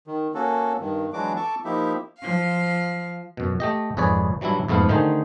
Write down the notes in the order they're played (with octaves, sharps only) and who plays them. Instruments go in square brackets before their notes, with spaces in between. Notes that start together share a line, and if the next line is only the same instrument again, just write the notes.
[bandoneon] D#3
A#3 C#4 F#4 A4
G2 D#3
E3 F#3 G#3 D4 F#4 D6
A4 A5 C#6 D6
F3 A#3 D#4 E4 G4 E5
[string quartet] F3 F5
[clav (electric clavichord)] F#2 B2
A3 G4 D#5
G#1 F2 G#4 B4 C#5 D5
E3 F#3 G3 D4 E4
F2 G#2 A3 B3 E4 F5
D3 D#3 A3 D#4 G#4 C5